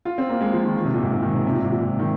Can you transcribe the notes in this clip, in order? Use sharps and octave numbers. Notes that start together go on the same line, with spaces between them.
F4
C4
A#3
G#3
F3
D#3
D#3
C3
A#2
G#2
A#2
D#3
C3
C3
A#2
G#2
A#2
C3
D#3